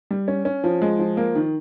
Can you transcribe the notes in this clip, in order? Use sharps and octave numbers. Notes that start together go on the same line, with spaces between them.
G3
C#4
C#4
F3
G#3
F3
A#3
D#3